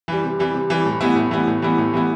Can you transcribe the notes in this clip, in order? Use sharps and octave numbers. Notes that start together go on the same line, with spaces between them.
E3 G3
C3
E3 G3
C3
E3 G3
A2
E3 G3 B3 E4
A2
E3 G3 B3 E4
A2
E3 G3 B3 E4
A2
E3 G3 B3 E4